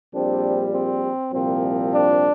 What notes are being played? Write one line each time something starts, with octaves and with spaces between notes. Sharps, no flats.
A#1 A#2 G3 C4 D4
C4
C2 A#2 F3 C4
D4